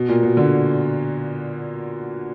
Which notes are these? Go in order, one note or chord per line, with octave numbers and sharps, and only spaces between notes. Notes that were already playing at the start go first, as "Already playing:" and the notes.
Already playing: B2
A#2
B2
D3